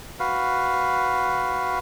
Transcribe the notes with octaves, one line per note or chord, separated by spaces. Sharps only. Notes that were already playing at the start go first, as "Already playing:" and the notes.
F#4 B4 F5